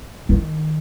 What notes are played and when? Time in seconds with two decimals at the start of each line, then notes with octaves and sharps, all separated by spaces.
0.29 D#3